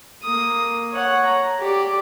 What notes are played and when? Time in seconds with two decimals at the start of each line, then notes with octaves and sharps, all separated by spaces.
0.23 A#3 D#6
0.92 C#5 F#5
1.25 A#5
1.59 G4 D5